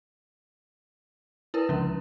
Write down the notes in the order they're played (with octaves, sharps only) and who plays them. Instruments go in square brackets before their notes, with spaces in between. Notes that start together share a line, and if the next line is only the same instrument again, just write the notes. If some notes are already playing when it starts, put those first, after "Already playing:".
[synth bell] E4 A#4 B4
[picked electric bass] C#2 D3 [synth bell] F3 C#4